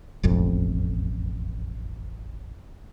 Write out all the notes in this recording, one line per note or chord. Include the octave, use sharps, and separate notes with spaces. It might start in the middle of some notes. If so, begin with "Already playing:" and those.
E1 A1 F2